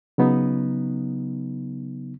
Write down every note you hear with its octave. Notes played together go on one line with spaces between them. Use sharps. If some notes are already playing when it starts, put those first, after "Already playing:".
C#3 F#3 B3 D#4